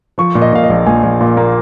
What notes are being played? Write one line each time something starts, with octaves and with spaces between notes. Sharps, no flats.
F3 C#6
A#2
D#5
A#2 F5
D#5
A#1
A#1 G#5
A#1
A#2
A#3